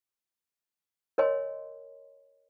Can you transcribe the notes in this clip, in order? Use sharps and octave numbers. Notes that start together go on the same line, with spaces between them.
A#4 C#5 D#5 G#5 C6